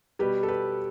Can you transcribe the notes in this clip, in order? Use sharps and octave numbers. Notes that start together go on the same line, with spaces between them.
B2 G3 G4 B4
A4
G4 B4